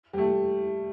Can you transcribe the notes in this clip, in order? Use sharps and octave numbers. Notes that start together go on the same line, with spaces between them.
G3
A3